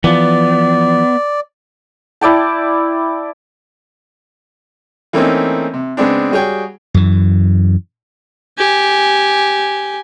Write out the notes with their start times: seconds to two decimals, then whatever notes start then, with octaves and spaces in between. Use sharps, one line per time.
0.04 E3 F3 B3 D5
2.21 E4 D5 G5 A5
5.13 E3 A3 A#3 C4 C#4 D#4
5.74 C3
5.97 C#3 G#3 B3 C4 D4
6.31 G3 F#4 G#4 C#5 G5
6.95 F#2 E3
8.58 G4 G#5